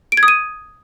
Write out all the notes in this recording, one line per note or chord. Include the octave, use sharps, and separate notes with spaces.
D7
G#6
D#6
D#7